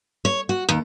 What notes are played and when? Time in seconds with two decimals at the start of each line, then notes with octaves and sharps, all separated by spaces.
0.25 C#5
0.49 F#4
0.69 D#2